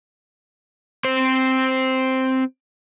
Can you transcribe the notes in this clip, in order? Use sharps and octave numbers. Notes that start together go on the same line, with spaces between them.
C4 C5